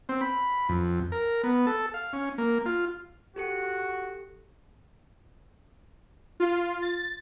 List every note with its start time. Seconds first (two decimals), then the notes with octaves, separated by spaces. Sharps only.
0.09 C4
0.21 B5
0.69 F2
1.12 A#4
1.44 B3
1.67 A4
1.94 F5
2.13 C#4
2.38 A#3
2.66 F4
3.36 F#4 G4 A4 C#7
6.40 F4
6.82 A6